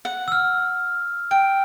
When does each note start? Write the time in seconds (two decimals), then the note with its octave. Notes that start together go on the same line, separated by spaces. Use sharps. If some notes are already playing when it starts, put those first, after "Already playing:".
0.05 F#5
0.28 E6 F6
1.31 G5 D7